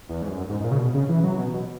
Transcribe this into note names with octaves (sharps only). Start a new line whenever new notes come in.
E2
G#2
F#2
G#2
G#2
A#2
C#3
B2
C#3
E3
F#3
B2
B2